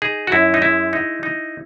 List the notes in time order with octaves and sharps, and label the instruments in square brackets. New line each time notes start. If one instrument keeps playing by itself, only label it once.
[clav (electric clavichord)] D#4 G#4
F#4
F#2 E4
D#4
G#3 E4
D#4
D#4